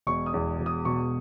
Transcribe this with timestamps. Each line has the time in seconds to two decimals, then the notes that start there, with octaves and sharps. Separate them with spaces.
0.07 E1 C#6
0.26 D#6
0.34 E2
0.59 E1
0.66 D#6
0.85 B2 C#6